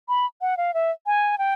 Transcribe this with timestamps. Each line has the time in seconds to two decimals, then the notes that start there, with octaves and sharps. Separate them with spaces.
0.09 B5
0.41 F#5
0.57 F5
0.74 E5
1.06 G#5
1.38 G5